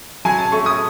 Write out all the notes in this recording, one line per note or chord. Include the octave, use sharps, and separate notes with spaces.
F#3 G#5
A5
A3 C#6
D#6